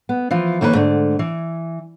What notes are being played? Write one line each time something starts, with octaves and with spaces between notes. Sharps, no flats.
B3
E3 F3 F4
F2 D#3 A#3 C#4 G4 B4
G#2 D3 A3
E3